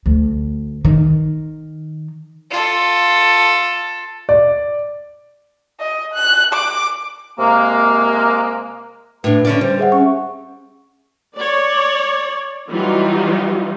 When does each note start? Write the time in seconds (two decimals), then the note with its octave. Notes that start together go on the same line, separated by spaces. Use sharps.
0.06 D2
0.85 D#3
2.51 F4 A4
4.29 D5
5.80 D#5
6.14 F#6
6.54 D6
7.39 C3 G#3 A#3
9.24 A2 D4 B4
9.45 D3 C#4 D5
9.61 G3 C5
9.79 G#4 E5 F#5
9.92 C#4 C#6
11.37 C#5 D5
12.71 E3 F#3 G3 D#4 F4